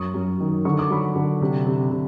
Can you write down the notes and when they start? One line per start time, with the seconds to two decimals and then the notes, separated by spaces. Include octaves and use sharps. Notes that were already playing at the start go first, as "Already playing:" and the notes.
Already playing: F#2 C#6 D#6
0.14 F#2
0.40 D#3
0.65 D3 C#6
0.79 D6
0.90 F#3 B5 C#6
1.16 D3
1.42 C3
1.66 C3
1.91 C3